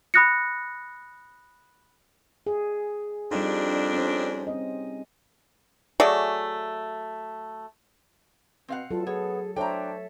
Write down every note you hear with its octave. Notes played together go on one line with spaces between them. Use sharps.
B5 D#6 F#6 A#6 C#7
G#4
F2 G3 D4 D#4
C#4 C5
C4 D#5
F#3 A3 G#4 D5
B2 C4 F5 F#5
E2 F#3 F4 A4
B3 G#4 C#5
D4 A4 C5 C#5 E5 G5 A#5